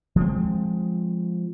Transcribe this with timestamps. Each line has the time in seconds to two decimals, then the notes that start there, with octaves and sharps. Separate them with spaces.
0.16 F3 G#3 A3 C4